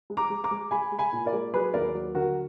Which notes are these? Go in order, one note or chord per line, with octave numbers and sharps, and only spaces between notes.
G#3
A#5 D6
G#3
A#5 D6
G#3
G#3 G#5 B5
G#3
G#5 B5
A#2
A#4 D5
G#3
F#3 G#4 B4
D#2 A#4 D5
F#3
D3 F#4 A#4